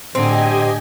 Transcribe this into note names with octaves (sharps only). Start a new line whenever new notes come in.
A2 D3 C4 G4 D#5 G#5